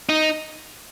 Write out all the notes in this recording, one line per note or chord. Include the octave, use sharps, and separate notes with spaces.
D#4